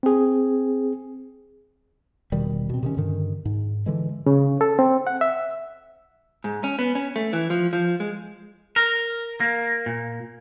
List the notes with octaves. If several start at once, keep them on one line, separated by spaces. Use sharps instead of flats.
C4 G#4
E1 B2 D#3 G3
B2 C4
C3 D#3 C#4
G2 D3 D#3
G#2
D3 E3 G#3
C#3
A4
C4
F#5
E5
G#2
C#4
B3
C#4
A3
E3
F3
F3
G#3
A#4
A#3
A#2